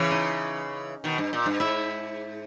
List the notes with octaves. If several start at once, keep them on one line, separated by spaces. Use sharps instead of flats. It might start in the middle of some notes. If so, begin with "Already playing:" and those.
Already playing: C#3 E3 C#4 C#5
D#4 D#5
B2 D#3
G2
A#2
G2
G#2 E4 E5